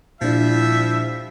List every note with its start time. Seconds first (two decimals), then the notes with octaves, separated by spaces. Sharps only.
0.22 A#2 F3 G3 D4 E4 E5